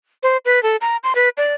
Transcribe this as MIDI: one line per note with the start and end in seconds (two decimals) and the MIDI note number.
0.23 0.37 72
0.45 0.62 71
0.63 0.76 69
0.81 0.97 82
1.04 1.13 84
1.15 1.29 71
1.37 1.54 74